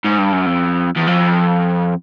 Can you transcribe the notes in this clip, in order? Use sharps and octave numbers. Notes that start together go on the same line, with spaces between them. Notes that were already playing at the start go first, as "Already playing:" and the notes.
G#2
G2
F#2
F2
E2
F2